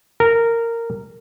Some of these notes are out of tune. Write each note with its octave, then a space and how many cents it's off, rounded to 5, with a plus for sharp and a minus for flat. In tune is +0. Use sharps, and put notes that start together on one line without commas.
A#4 -15